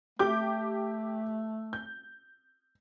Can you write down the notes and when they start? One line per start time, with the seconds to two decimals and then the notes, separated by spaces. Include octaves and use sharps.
0.19 A3 G4 D6 G6
1.73 G6